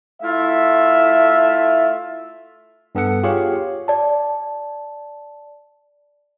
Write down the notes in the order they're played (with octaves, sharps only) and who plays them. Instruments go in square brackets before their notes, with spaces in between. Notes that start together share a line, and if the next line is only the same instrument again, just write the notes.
[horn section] A3 E4 F4 E5
[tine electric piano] G2 B3 A4 F#5 C#7
F4 G4 G#4 C#5 F5
[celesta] D5 A5